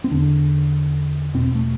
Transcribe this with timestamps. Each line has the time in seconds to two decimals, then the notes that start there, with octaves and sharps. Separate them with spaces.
0.04 C4
0.11 E2 D3 D4
1.34 E2 B2 C4
1.55 A3